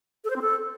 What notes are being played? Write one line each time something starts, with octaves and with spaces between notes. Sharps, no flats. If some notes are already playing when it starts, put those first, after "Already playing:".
A4
C5
C4
A4